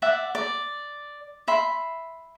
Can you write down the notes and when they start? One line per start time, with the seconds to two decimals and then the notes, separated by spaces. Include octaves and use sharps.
0.02 D5 E5 F#5
0.35 D5
1.48 E5 B5 C6